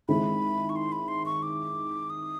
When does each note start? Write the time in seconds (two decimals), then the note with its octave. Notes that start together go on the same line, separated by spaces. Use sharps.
0.08 D#3 G#3 C4 E4 B5
0.69 C#6
0.76 C6
0.92 B5
1.08 C6
1.26 C#6
1.43 D6
2.10 D#6